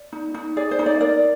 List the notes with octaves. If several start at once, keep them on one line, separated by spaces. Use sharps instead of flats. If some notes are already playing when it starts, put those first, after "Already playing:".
Already playing: D5
D#4
D#4
G#4 D5
C5
D#4
D5
A#4 D5